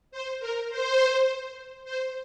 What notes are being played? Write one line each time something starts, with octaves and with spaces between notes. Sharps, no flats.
C5
A#4
C5
C5